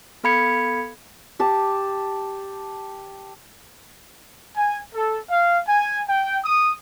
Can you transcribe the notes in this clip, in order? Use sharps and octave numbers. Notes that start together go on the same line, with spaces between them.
B3 A4 F5 B5 G#6 C#7
G4 A5
G#5
A4
F5
G#5
G5
D#6